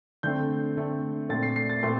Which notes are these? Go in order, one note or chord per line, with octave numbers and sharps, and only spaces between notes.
D3 A3 C4 G6
D3 A3 C4
A#2 A3 C4 A6
C7
C7
A6
A#2 A3 C4 C6